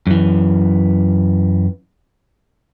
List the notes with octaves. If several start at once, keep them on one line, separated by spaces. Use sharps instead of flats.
F#2 E3